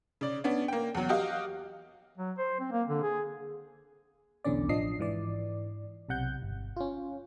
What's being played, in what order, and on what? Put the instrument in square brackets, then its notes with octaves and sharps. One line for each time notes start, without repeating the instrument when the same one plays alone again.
[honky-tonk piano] C#3 D5
B3 C#4 D4
A#3 G5
E2 F#3
F#4 G4 D#5 F5
[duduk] F#3
C5
C4
A#3
D3
G#4
[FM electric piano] B1 E2 D3 C#4 D5
A1 F3 D4 D#5 C7
G#2 E3 D5
B1 C3 F#5 G6
G1
C#4 F4